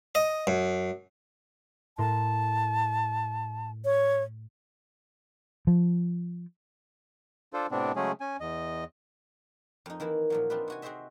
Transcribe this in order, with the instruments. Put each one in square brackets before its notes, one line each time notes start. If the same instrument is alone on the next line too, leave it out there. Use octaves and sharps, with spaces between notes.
[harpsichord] D#5
F#2
[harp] A2 A#4 C6 [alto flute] A5
[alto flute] C#5
[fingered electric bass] F3
[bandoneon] D4 F4 A4 C5
A2 C3 B3 C4 D4
C#3 F#3 G#3 A3 C#4 G#4
C#4 G#5
E2 D#5
[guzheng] F2 D#4
D#3 E3 A#3 E4
A#2 F3 F#3
C4 D4 D#4 F4 B4
C3 F#4 G#5
C4 F#4 G#4 C5 D#5 E5